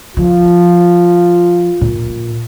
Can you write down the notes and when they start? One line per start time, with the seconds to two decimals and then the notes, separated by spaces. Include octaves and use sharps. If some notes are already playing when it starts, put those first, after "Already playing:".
0.17 F3 F4
1.81 A#2